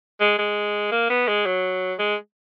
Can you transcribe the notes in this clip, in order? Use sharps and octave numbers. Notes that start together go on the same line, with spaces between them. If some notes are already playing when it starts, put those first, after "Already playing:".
G#3
G#3
A#3
B3
G#3
F#3
G#3